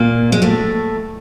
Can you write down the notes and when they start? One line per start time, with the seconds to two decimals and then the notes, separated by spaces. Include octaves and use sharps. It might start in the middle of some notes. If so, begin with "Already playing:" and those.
Already playing: A#2 A#3
0.32 G#3
0.42 A2 A3